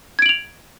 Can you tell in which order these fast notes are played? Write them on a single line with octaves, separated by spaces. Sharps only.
G#6 D7 F#7 F7